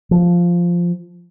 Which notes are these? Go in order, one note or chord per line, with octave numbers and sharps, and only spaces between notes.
F3